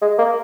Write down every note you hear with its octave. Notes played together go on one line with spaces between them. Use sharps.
G#3
A#3